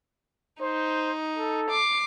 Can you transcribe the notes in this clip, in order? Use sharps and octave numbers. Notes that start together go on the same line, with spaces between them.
D#4 C5
A4
D6 C7